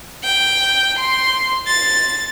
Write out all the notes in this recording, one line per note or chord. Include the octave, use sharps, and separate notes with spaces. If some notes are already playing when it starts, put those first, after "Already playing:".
G5
C6
A6